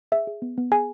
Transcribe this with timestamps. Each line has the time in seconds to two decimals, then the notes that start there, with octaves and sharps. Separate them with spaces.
0.12 G#4 E5
0.27 G#4
0.42 B3
0.58 B3
0.72 G#4 G#5